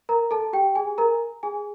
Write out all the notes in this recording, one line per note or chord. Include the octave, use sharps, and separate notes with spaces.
A#4 A#5
A4 A5
G4 G5
G#4 G#5
A#4 A#5
G#4 G#5